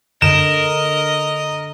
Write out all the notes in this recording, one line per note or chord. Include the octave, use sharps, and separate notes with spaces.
D3 A#4 D#5 E7